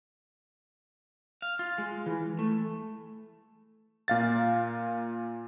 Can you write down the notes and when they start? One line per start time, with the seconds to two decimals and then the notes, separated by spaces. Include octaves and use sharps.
1.42 F5
1.59 F4
1.78 G#3
2.06 E3
2.39 A3
4.08 A#2 F5 A6